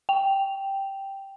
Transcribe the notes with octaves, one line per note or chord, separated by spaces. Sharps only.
G5 F7